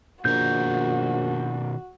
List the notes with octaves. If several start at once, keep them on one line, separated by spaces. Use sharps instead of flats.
A#1 B2 D#3 F#4 A#4 G6